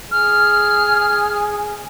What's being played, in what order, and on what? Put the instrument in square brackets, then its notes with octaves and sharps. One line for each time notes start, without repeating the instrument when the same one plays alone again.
[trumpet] G#4 [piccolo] F6